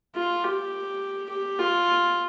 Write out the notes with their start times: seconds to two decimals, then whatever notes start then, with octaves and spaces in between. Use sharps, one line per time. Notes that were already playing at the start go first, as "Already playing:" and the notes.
0.16 F4
0.44 G4
1.30 G4
1.59 F4